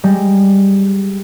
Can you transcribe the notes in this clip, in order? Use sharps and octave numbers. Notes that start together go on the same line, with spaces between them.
G3 G#3